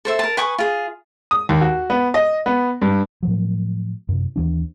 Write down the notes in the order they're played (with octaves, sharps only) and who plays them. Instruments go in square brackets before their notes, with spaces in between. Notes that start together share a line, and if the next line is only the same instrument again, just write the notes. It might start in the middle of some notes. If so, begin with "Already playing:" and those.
[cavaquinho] A4 C5 E5
A#4 A5
B4 G#5 C#6 D#6
F4 G#4
[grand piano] D#6
D#2
F#4
B3
D#5
B3
G2
[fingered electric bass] A2 F3 F#3
F#2 C3
D#2 E3 D4